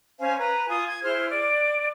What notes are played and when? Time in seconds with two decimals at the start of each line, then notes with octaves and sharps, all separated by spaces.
0.19 C#4 C5 F5 G#5
0.37 B4 A#5
0.68 F4 G#5 D#6
0.87 G#6
1.02 E4 G#4 C5 F6
1.29 D5